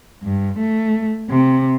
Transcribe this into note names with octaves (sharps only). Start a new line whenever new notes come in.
G2
A3
C3